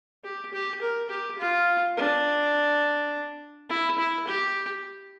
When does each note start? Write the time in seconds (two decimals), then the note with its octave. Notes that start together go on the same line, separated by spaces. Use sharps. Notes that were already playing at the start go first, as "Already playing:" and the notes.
0.24 G4
0.53 G4
0.82 A#4
1.10 G4
1.39 F4
1.97 D4
3.69 E4
3.98 E4
4.27 G4